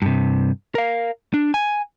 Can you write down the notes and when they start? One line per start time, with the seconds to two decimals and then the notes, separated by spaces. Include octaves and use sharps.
0.02 G2 C3
0.75 A#4 F5
1.34 D4
1.54 G#5